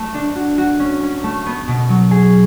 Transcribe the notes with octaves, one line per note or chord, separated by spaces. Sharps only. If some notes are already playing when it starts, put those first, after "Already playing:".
Already playing: A3
D4
F#4
F#4
C#4
C#4
A3
B3
B2
F#3
G#4